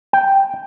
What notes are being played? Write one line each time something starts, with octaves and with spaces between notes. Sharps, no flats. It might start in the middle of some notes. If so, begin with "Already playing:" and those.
G5